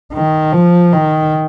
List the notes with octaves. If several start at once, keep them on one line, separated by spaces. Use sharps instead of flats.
D#3
F3
D#3